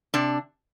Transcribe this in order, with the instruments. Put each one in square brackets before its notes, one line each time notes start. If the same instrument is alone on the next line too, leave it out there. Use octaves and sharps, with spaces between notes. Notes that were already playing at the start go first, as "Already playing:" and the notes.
[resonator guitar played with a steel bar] C3 D4